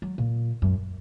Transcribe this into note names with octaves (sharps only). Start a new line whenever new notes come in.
F#3
A#2
F#2